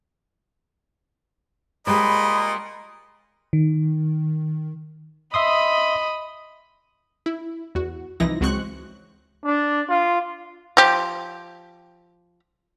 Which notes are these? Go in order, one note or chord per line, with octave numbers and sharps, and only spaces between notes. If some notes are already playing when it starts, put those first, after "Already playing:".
A#2 G#3 G4 C5 D#5 B5
D#3
D#5 E5 B5 C6 D#6
E4
E2 F#4
C2 E3 F3 D#4 E4 A#6
C#2 F#3 G#3 C4 C#6 F#6
D4
F4
F3 G4